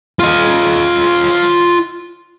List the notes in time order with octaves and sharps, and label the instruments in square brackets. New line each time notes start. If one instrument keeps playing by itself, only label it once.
[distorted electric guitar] F4 D#5